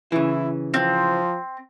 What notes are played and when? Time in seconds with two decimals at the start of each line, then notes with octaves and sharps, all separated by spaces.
0.12 C#3 E3 E4
0.74 F3 C4